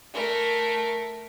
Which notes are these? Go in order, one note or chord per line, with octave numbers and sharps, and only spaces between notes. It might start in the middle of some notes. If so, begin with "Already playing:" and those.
A3 A#4